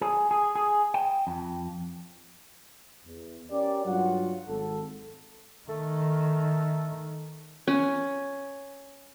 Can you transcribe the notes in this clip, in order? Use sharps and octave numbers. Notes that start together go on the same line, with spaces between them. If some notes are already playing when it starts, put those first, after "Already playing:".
G#4
G#4
G#4
G5
F2
E2
C#4 G4 A#4 D5
G2 F#3 F4 F#5
G#1 A4
D#3 A3
C#4